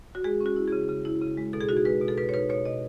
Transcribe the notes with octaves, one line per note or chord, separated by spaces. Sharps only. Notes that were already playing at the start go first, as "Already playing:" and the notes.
F#4
G#3 G#4
C#4
F#4
E4
C#3 G#4
C#3
E4
C#3
G#3
B2 A4
G#4
D#4 F#4
G#4
G#3 B4
B2
A4
B2 B4
C#5
D#4 B4
B2 C#5
B2 D#5